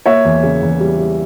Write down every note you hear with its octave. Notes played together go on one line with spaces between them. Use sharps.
A#3 C#5 E5
E2
C#3
E2
G3
G3